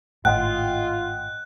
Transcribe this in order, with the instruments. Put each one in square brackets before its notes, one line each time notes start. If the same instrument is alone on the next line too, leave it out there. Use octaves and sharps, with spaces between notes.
[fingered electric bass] G#1 A2 [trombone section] F4 [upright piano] D#5 F#5 G5 [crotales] F#6